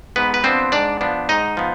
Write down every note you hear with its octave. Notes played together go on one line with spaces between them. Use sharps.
G#2 B3 B4
B4
F3 B3 C4 D4 C5
G#2 D4 D5
F3 B3 D4
G#2 D#4 D#5
F3 B3